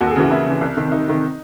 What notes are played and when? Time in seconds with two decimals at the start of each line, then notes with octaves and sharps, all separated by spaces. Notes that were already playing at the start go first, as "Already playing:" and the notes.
0.01 D#2 F#4
0.07 A4
0.11 G#4
0.16 C#3 E3 F#4
0.31 D#2 E4
0.46 C#3 E3
0.61 C2
0.76 C3 D#3
0.92 C2 D#4
1.07 C3 D#3